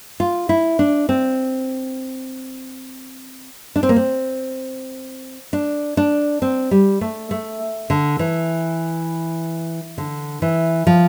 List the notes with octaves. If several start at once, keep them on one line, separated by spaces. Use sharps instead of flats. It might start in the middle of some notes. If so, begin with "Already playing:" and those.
F4
E4
D4
C4
D4
C4
A#3
C4
D4
D4
C4
G3
A3
A3
D3
E3
D3
E3
F3